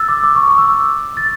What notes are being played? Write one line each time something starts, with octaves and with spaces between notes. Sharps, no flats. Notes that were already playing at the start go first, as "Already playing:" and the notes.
Already playing: E6 A6
D6
D6
C#6
C#6
E6
A6